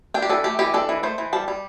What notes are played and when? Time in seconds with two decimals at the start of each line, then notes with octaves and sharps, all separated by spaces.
0.14 D4 G5
0.22 G4
0.29 E3 A4
0.44 A3 G4
0.59 E3 G4
0.74 D4 A4
0.89 E3
1.03 A3 C5
1.18 E3
1.33 G3 A5
1.48 G3